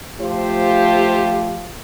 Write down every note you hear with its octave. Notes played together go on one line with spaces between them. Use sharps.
F3 A3 F4 G4 C5